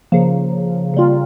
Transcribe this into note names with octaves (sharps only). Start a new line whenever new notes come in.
C#3 F3 A#3
C#3 G3 A#3 F4